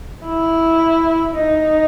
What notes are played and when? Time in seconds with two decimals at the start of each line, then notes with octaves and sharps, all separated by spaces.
0.24 E4
1.35 D#4